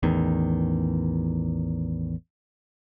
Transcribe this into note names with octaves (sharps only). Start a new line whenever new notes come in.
A1 E2 D#3